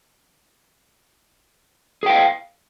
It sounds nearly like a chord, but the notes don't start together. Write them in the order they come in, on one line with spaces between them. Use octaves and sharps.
G#4 G5 F5